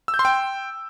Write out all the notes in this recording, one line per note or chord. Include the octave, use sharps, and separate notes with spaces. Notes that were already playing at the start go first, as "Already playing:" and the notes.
E6
G6
C6
G5